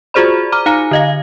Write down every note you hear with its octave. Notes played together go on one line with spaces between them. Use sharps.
F4 F#4 G#4 C5 D5 B5
A#5 D6 F6
D#4 F5 G#5 A#5
D3 D#5 F5